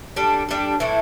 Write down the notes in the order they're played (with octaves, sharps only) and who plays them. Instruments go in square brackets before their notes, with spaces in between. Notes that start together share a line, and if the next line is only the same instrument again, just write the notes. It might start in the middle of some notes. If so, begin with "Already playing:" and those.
[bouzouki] G3 D4 A4
G3 D4 A4
A2 E3 A3 E4